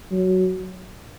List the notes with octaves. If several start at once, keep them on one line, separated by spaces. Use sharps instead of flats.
F#3